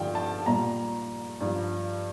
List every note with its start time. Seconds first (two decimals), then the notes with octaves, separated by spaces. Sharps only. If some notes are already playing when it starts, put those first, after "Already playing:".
Already playing: G2 D3 F3 G5
0.15 A5
0.46 A#2 G3 A#5
1.40 G2 F3